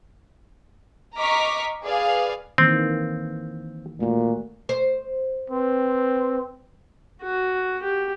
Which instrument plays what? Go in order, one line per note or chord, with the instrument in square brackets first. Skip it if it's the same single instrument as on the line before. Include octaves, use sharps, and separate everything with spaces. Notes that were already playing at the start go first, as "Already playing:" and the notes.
[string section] D#5 A#5 C#6 D6 F6 B6
G#4 B4 D5 F5
[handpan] D#3 E3 A#3 [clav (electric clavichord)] C4
[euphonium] A#2 [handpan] A3 F#4
[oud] C5
[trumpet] C4 [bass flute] B4
[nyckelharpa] F#4
G4